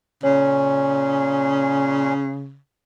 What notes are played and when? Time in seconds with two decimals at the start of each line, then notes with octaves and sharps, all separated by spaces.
0.23 A#2 C#3 C#4 C#5